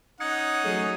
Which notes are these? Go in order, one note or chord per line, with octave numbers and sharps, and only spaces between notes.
C#4 D#4 F#5 D#6 G#6 C#7
F#3 A3 G#4